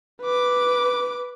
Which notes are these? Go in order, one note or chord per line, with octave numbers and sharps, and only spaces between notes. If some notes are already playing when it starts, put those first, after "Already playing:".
B4 D6